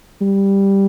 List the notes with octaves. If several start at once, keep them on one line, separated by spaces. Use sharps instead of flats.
G3